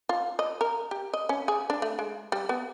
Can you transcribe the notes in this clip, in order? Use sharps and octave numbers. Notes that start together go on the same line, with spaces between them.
F4
D#5
A#4
G4
D#5
C#4
G#4
D4
A3
G#3
G3
B3